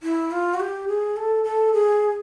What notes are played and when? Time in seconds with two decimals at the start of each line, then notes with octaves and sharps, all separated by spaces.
0.03 E4
0.31 F4
0.54 F#4
0.60 G4
0.88 G#4
1.17 A4
1.44 A4
1.73 G#4